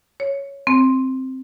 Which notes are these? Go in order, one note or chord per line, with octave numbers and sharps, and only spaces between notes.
C#5
C4